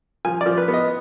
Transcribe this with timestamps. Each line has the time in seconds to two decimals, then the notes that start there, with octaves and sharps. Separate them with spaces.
0.25 F3 G#5
0.41 D5
0.46 F3
0.58 B4
0.68 B3
0.74 D#5